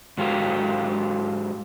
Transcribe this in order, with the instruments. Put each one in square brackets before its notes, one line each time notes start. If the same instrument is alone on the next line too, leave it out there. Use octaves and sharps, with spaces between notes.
[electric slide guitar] G#2 F#3 F4 G4 A4